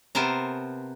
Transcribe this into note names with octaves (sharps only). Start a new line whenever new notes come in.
C3 B3 A#4 C5 A5 A#5